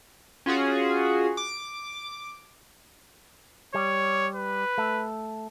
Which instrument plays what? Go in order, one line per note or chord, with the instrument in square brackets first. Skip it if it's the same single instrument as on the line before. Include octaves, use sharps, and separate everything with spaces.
[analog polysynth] C#4 F4 F#4 G#4
D6
[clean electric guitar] G3 [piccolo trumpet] C#5
[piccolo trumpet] B4
[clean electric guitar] A3